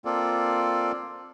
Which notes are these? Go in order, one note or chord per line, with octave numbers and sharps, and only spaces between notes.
A#3 C4 F4 A4 D5